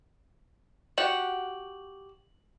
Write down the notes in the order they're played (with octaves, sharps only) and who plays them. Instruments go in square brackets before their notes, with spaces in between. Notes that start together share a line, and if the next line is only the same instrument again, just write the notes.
[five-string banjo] F#4 G4 F#5 [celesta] F#7